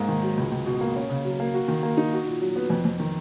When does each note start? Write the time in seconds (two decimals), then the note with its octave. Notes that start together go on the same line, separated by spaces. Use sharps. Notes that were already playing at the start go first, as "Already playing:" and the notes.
Already playing: G#2 A#3
0.08 D#3
0.23 F#3
0.37 C#2
0.52 C#2
0.66 B2
0.81 A#3
0.96 C#4
1.09 C#3
1.25 F#3
1.40 A#3
1.54 F#4
1.68 D#3
1.83 A#3
1.97 D#4
2.13 F#4
2.26 A#2
2.41 F#3
2.56 B3
2.70 F2
2.85 F2
2.99 D#3